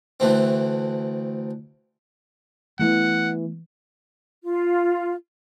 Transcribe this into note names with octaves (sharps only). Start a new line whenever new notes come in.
D2 E3 A3 C4
E3 G3 A3 B3 F#5
F4